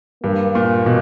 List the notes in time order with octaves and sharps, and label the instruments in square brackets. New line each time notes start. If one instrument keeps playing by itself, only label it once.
[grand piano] G2 [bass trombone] A#3
[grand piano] A#2
B2